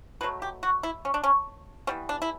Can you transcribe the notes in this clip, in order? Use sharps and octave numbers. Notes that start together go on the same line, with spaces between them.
B2 F#3 A3 B4
G4
F#4
E4
C#4
D4
C#4
E3 G3 B3 C#4
D4
E4